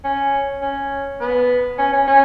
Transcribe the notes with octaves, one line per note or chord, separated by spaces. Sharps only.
C#4
C#4
B3
C#4
C#4
C#4